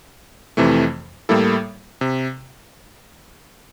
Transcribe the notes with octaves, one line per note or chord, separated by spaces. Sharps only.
F2 C3 E3 A3
A2 G3 A#3 E4 A4
C3